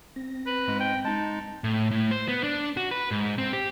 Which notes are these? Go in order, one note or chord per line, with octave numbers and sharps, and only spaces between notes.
C4 A#6
B4
G#2 G#3
G5
G#3 D#4 A5
A2
A2
C5
B3
D4
F#4
B4
G#2
C4
G4